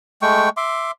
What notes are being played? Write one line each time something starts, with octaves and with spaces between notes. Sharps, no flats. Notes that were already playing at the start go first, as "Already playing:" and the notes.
G#3 A3 G5 C#6
E5 C6 D6